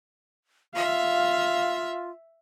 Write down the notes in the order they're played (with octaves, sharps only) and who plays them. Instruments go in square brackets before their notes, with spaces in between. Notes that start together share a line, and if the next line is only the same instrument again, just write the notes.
[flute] F4 [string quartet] E5 [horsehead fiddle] F5